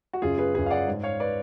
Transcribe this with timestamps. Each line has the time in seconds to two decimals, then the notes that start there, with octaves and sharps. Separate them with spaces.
0.13 F#4
0.22 F#2 C#3 F4 G#4
0.38 G#4 B4
0.55 F#2 C#3 G#4 B4
0.66 F5
0.71 D5 F#5
0.87 G#2
1.03 C#5 F5
1.20 B4 D5